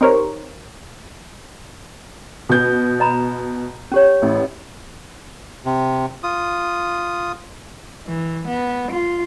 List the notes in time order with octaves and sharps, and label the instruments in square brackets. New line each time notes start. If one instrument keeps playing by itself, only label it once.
[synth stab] C4 D#4 G4 A#4 C5 C#5
[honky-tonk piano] B2 G6
[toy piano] D#5 A#5 B5
C#4 G4 C#5
[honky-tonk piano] A1 A2
[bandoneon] C3
F4 D#6
[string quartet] E3
B3
F4